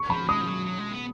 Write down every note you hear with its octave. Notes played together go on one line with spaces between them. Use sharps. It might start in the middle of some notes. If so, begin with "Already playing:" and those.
Already playing: C#6
F3 B5
G#3 D#6
F3
F#3
F#3
G#3
B3